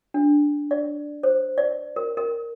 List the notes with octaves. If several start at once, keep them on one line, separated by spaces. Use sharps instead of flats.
D4
D5
C5
D5
A#4
A#4